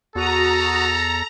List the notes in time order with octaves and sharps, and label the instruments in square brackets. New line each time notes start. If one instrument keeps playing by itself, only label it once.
[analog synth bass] E2 [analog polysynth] F#4 D#6 [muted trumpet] A4 [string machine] A#5